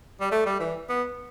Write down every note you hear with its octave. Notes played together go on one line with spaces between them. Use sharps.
G3
A3
G3
E3
B3